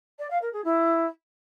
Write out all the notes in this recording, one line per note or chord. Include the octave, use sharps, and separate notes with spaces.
D5
F5
A#4
G#4
E4